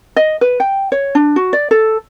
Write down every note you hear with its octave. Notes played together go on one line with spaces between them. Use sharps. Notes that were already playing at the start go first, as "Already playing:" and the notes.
D#5
B4
G5
C#5
D4
F#4
D5
A4